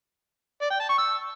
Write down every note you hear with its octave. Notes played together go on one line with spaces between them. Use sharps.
D5
G5
A5
C#6
E6